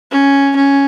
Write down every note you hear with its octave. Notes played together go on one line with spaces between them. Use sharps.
C#4
C#4